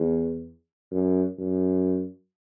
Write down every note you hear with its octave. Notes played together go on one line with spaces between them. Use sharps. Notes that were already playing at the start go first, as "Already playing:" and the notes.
Already playing: E2
F#2
F#2